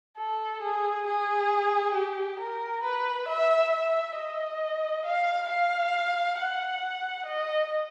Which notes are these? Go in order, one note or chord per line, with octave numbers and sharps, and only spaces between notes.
A4
G#4
G#4
G4
A#4
B4
E5
E5
D#5
F5
F5
F#5
D#5